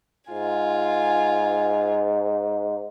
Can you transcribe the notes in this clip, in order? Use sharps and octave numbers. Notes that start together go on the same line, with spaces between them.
G#2 F4 G#5